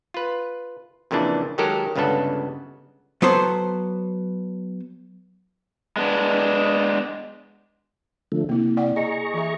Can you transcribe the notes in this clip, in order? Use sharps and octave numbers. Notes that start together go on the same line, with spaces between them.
F4 B4
F2 A#2 C#3 E3 D4
D#3 F#3 G#3 G4 A4 A#4
G1 C#2 C#3 B3 D4 A4
F#3 B3 A4 C5
G#3 B3 D4
D3 F3 A3
C3 A#3 E4
D5 F#5 G5
G#4 D#5 A#5 C#6
E3 E5